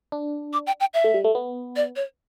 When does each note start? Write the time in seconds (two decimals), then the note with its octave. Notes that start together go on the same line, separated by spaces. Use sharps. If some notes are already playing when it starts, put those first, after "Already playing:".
0.12 D4
0.53 D6
0.67 G5
0.80 G5
0.94 E5
1.04 A3
1.14 G3
1.24 A3
1.35 B3
1.76 D5
1.96 C#5